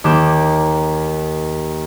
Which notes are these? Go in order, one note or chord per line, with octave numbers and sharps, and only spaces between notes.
D#2 A#3 D6 G6 E7